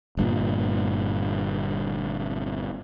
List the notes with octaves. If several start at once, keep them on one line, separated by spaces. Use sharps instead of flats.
G1 G2 A#2